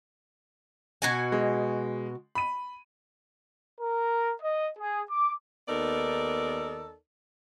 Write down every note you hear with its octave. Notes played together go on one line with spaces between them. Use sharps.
B2 F#4 G#5
G#3
B5 D#7
A#4
D#5
G#4
D6
D#2 B3 D#4 A4 A#4 D5